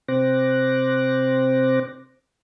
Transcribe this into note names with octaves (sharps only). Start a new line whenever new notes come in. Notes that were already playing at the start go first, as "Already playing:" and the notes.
C3 C4 C5 D6 F#6 A#6